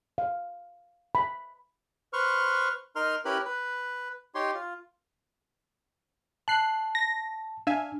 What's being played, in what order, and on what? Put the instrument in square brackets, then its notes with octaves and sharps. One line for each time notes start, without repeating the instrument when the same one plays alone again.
[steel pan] F5
B5
[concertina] B4 C5 C#6 F6
D#4 A#4 C6 F6
C#4 E4 G4 A#4 B4 B5
B4
D#4 G4 C#5 C6
F4
[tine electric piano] A5 [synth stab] F#6 C7
[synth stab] A#6
[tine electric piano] D4 [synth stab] E5 F5 G#5